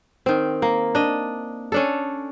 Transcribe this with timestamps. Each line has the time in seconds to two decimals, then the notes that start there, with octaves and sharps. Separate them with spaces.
0.26 D#3 C4
0.62 A#3
0.95 D4 D#5
1.72 C#4 D4 A4